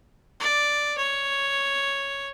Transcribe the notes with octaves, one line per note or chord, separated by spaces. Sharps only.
D5
C#5